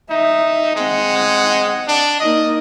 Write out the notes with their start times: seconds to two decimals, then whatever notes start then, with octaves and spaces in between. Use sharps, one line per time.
0.10 D#4 E5
0.76 G#3 C4 F#5
1.88 D4
2.20 A#3 D#4 D#5